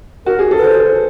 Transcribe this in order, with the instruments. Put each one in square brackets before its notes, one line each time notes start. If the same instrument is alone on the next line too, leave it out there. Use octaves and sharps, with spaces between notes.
[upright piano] F#4 [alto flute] A#4
[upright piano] G#4
A4
[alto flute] B4
C5